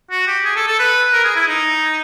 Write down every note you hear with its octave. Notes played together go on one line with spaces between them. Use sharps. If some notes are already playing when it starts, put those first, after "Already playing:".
F#4
G4
G#4
A4
A4
B4
A#4
G#4
E4
D#4